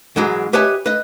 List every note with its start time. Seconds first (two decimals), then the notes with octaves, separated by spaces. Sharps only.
0.16 G#2 E3 F#3 G#3
0.53 G4 B4 C#5 D#5 E5 G#5
0.86 B4 D#5